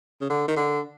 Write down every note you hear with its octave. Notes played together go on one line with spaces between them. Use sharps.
C#3
D3
D#3
D3